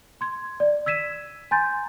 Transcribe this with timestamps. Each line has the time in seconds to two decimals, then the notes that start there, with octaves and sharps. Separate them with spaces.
0.21 C6 G#6
0.60 D5
0.86 E6 G#6 B6 D#7 E7
1.51 G#5 A#5 C6 G6 A6